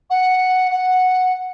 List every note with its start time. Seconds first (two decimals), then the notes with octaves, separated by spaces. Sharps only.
0.10 F#5
0.70 F#5